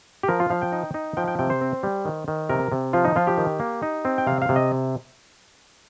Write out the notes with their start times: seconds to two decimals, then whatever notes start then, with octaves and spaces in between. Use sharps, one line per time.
0.23 G4
0.28 F3 A#4
0.40 F4
0.50 F3 F5
0.62 G5
0.72 D#4
0.94 D#4
1.17 F3 G5
1.28 G5
1.39 C3 G5
1.50 C5
1.61 C4
1.83 G3
2.05 D#3
2.28 D#3
2.49 C3 A#4
2.72 C3
2.93 F3 F4
3.05 D#4
3.16 F3 F4
3.27 G4
3.38 D#3
3.60 A#3
3.83 D#4
4.05 C4
4.18 G5
4.27 C3 F5
4.42 F5
4.49 C3
4.56 D#5